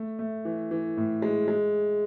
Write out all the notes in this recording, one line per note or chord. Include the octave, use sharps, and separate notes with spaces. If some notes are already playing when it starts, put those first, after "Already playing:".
Already playing: A3
A3
E3
E3
A2
G#3
G#3